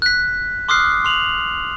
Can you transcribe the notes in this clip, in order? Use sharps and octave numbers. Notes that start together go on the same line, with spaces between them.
F#6 B6
C6 D6 D#6 F6 F#6 C7
C6 F7 F#7